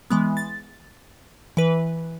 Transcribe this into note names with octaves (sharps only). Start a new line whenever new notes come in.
E3 G#3 B3
A6
E3 B4